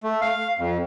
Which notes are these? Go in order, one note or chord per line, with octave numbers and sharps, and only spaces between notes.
A3
F5
F2